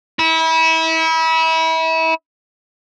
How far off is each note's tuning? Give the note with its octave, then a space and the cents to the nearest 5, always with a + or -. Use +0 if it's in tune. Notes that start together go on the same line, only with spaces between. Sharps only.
E4 -30